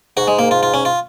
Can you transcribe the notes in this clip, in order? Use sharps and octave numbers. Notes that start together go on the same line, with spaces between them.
G#2 F#4
G#3
A#3
F4
F4
C#4
F4